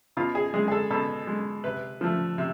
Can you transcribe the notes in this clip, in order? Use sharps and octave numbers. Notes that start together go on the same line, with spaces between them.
B2 F4
G#4
G#3 G#4
G#4
A4
B2 A4
G#3
C3 B4
F3 A3
C3